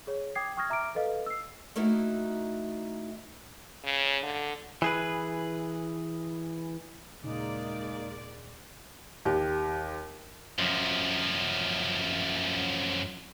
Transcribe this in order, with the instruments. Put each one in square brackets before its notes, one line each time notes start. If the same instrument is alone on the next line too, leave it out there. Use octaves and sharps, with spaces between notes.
[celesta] G#4 C#5
G5 D6 D#6 G#6 C7
G5 C#6 D#6 F6 G#6 A#6
E5 A#5 D6 F6 D7
A4 B4 D#5 F5
E6 C7
[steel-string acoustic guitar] A3 A#3 D#4 E4 F#4
[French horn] C#3
D3
[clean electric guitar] E3 G#4 B4
[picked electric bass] D#1 A#2 C#3 [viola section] G#3 D5 [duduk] A#3 [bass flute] D#4
[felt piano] D#2 G4
[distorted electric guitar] F#2 F3